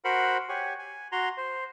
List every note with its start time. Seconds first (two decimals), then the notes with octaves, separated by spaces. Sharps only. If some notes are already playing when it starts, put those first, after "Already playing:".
0.05 F#4 A#4 C5 F#5 B5
0.49 G4 C#5 F#5 G#5
0.79 G#5
1.12 F#4 A#5 C6
1.37 C5